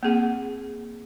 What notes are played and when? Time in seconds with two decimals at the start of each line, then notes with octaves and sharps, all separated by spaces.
0.03 A#3 C4 G#4 F#5